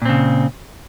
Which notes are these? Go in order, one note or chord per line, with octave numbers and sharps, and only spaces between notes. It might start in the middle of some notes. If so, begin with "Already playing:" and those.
A#2 C#3 C4